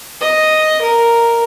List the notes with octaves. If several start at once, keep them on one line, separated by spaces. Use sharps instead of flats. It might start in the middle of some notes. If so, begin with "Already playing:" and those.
D#5
A#4